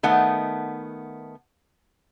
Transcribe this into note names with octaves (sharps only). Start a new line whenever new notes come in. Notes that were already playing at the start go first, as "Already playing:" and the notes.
D#3 A3 B3 F#5